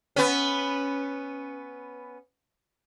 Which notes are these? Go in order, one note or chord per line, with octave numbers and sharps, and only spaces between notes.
B3 C#4